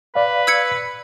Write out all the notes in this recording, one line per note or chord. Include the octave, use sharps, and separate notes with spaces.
B4 D5 F5
E6 G#6 C#7